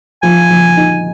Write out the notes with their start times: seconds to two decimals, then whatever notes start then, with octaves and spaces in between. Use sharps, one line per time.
0.23 F3 G#5
0.50 F3
0.77 D#4